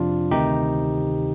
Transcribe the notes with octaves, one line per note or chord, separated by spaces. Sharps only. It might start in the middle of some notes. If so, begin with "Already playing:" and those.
Already playing: F2 C3 F3 D4 F4
D2 C3 D#3 D#4 G4